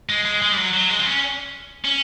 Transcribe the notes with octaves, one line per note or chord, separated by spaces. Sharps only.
G#3
G#3
G#3
G3
F#3
F#3
G#3
C4
C#4
C#4